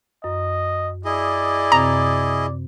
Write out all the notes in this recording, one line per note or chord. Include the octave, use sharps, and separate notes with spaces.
F#2 D#5
E4 G#4 D5 D#5
F#2 C3 C4 A#5